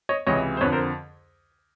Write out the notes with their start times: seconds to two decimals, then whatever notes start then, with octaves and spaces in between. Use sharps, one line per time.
0.09 C#5 D#5
0.27 C#2 C3 E3 C#5 D#5
0.57 C5
0.61 F2 B4 C#5
0.65 D3
0.72 A#4 C5